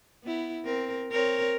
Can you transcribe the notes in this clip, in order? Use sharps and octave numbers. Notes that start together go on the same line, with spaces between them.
B3 E4
C4 A#4
C4 A#4 C#5